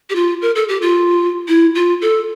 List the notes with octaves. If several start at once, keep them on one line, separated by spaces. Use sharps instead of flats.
G4
F4
A#4
A4
G4
F4
E4
F4
A4